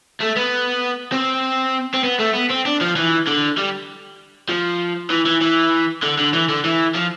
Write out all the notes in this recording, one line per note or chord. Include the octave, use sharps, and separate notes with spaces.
A3
B3
C4
C4
B3
A3
B3
C4
D4
F3
E3
D3
G3
F3
E3
E3
E3
D3
D3
E3
D3
E3
F3